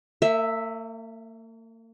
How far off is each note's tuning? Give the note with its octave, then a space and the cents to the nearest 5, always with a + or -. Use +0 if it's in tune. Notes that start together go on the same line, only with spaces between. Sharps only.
A#3 -45 E5 +0